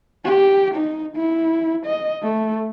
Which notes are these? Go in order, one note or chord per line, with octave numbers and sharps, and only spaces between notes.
G4
D#4
E4
D#5
A3